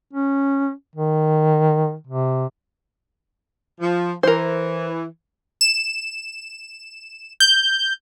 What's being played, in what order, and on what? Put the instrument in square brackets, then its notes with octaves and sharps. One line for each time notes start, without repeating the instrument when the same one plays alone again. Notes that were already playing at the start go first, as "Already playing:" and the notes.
[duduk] C#4
D#3
C3
[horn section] F3
[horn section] E3 [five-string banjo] A#4 C5
[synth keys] E7
G6